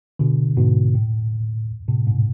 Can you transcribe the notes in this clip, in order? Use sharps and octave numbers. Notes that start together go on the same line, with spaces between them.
B2 D3
G#2 B2
A2
A2 C3
G#2 B2